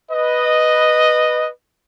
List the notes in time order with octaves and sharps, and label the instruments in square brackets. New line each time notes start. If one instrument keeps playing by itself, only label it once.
[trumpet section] B4 D#5